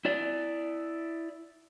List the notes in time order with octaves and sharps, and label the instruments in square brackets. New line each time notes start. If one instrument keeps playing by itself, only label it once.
[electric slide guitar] E4 D5